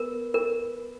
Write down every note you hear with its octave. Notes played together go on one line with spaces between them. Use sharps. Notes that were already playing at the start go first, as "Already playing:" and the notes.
Already playing: B3 A#4
A#4